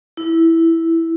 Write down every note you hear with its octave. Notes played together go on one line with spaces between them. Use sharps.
E4